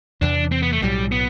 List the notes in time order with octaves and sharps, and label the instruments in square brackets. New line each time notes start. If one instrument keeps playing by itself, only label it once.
[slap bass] E2 C3 E3 [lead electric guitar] D4
[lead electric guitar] C4
B3
A3
[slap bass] B1 A2 F#3 [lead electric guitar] G3
[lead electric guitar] B3